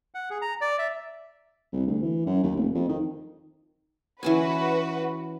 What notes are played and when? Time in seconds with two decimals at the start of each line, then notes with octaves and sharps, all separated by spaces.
0.14 F#5
0.30 G#4
0.42 A#5
0.61 D5
0.79 E5
1.72 C2
1.87 D2
2.02 E3
2.26 F#2
2.43 D#2
2.56 F1
2.75 F2
2.89 D#3
4.23 E3 C#4 F#4 B4 G#5